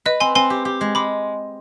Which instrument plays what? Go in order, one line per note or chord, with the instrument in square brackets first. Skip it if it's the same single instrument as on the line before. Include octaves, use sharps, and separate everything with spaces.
[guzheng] B4 [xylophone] D#5
[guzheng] C4 [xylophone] G#5 C6
[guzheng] C4 [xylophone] G#5 C6
[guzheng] G4
G4
G#3
[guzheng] G#3 [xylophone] B5 D6